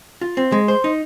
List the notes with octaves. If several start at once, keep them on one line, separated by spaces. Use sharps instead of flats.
F4
C4
G#3
C5
D#4